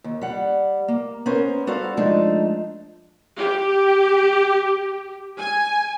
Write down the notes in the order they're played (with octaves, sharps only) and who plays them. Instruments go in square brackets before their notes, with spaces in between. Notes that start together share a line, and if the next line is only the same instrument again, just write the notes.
[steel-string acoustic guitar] D#2
G3 F#5
A#3
B3 C#4 A#4 C5
G3 F#4 A4 C5 F5
F3 G#3 A3 D4 D#4
[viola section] G4
G#5